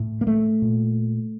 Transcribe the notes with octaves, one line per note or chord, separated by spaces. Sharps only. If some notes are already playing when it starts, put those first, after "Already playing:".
Already playing: A2
A#3
A3
A#2